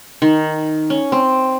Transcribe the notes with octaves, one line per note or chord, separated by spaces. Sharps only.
D#3
C#4
C4